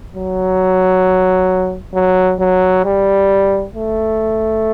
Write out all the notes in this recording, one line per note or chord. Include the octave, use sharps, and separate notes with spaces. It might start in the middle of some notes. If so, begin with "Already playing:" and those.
F#3
F#3
F#3
G3
A3